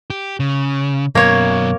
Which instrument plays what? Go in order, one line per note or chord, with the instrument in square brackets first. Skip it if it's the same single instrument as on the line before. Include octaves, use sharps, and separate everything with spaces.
[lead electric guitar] G4
C#3
[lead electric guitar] F#2 B2 [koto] A#3 C#5